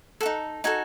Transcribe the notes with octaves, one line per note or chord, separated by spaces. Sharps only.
F#4 A4 F#5
D#4
D#4 F#4 A4 G#5